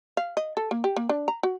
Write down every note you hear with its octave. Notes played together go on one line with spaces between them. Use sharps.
F5
D#5
A4
A#3
G4
A#3
D4
A#5
F#4